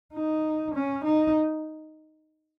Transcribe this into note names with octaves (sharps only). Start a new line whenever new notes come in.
D#4
C#4
D#4